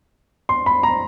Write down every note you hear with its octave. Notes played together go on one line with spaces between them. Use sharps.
C6
B5
A#5